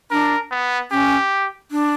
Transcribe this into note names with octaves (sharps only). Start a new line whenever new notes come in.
D4 A#4
B3
C#4 G4
D4